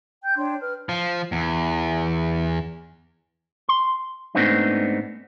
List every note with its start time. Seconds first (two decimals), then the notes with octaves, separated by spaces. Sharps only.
0.22 G5 G6
0.37 D4 C#5 G5 C6
0.61 B4 F6
0.89 F3
1.32 E2
3.69 C6
4.35 G#2 A3 B3 C4 D4 D#4